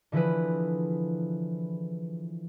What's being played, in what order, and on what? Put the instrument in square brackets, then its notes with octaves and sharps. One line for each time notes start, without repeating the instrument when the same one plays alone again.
[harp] D3 E3 F3 E4 G#4 B4